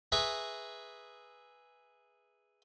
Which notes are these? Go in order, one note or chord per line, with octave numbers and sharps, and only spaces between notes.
G#4 B4 E5 A#5 C#6